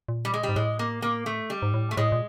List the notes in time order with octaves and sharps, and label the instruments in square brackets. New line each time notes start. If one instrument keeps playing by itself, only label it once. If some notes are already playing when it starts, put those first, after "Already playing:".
[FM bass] A#2
[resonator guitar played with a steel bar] G3
G#3
G3
[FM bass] G#2
[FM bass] A2 [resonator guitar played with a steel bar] G#3
[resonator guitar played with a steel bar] A#3
A#3
A3
G3
[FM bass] G#2
A2
[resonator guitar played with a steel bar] A3
[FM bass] A2 [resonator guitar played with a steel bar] G#3
[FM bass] A#2